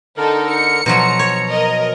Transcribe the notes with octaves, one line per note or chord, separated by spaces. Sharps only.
D3 D#4 A4 A#4
C#7
B2 F3 F#3 A#5
C#5
A#4 D#5